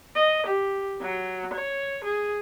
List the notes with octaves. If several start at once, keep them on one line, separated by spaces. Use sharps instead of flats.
D#5
G4
F#3
C#5
G#4